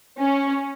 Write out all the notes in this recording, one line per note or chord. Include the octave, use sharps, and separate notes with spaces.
C#4